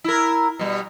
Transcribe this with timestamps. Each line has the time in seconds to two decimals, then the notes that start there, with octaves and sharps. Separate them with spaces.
0.04 E4 A#4
0.59 B2 G3